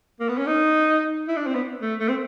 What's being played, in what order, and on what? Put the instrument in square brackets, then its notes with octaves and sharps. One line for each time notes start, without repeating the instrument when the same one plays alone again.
[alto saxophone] A#3
B3
C#4
D#4
E4
D4
C4
B3
A3
A3
C4